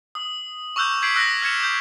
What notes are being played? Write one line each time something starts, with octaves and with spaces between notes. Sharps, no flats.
D#6
C#6 D6 E6 F#6 G6 E7
G6 G#6 B6 C7 D7 F#7
D#6 E6 F#6 A#6
F6 G#6 C#7 E7
D6 G6